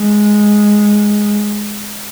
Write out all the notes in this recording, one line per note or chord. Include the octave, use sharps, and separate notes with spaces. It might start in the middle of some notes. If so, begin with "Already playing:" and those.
Already playing: G#3